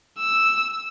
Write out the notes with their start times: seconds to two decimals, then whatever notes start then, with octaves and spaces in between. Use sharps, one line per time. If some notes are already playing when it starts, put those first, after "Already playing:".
0.19 E6